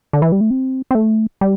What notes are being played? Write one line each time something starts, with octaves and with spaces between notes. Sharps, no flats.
D3
E3
G3
A3
C4
C4
A3
G3